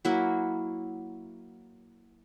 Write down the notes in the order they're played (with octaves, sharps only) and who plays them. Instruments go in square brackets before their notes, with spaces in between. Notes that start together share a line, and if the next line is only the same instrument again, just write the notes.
[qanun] F#3 A#3 E4 F#4